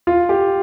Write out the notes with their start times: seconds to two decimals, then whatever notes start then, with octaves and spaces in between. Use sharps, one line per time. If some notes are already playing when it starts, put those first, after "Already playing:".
0.07 F4
0.29 G4